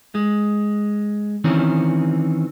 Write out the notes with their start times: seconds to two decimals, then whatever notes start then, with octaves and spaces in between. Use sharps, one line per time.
0.15 G#3
1.44 D#3 E3 C4 C#4